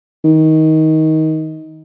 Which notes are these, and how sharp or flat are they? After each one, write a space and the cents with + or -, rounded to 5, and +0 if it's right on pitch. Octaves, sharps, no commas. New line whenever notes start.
D#3 +20